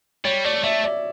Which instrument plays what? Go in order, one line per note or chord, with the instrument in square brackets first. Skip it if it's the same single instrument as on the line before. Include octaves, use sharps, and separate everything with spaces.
[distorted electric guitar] G3 [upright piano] C#5
[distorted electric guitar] A3 [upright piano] D5
[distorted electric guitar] A3 [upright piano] E5
[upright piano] D5